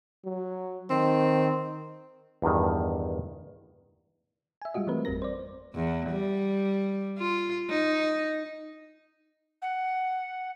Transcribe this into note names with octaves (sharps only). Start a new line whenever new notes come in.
F#3
D#3 C4
E2 G2 D#3
E5 G#5
G3 G#3 F4 F#4 D#5
E3 G3 A3 C4 A#4 B4
G#1 F2 G3 C4 A#4 A#6
C5 D5
E2
G3
F4
D#4
F#5